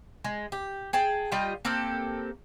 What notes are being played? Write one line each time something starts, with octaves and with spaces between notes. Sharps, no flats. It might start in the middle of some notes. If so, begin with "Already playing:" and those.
G#3
G4
G#4 G5 A5
G3 F4 D#5 G5
A#3 C4 G4 A4